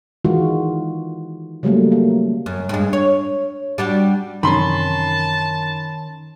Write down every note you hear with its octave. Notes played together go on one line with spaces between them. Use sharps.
D#3 E3 G#3 F4 F#4
C#3 F#3 G3 A3 A#3
A#3
F#2
G2 G#3
C#5
G3 D4 F#4
F#2 C3 D#3 E3 C#4 A5 B5 C6